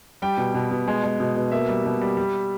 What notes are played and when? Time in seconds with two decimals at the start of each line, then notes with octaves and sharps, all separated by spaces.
0.22 G3 G5
0.37 B2
0.54 B2
0.71 B2
0.88 G#3
1.04 G#3
1.20 B2
1.36 B2
1.51 A#3 E5
1.68 G3
1.85 B2
2.01 G3
2.17 G3